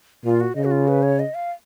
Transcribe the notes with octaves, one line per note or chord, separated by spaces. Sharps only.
A#2 F4
F#4
C#3 D#5
F#4
F4
B4
C#5
D#5
F5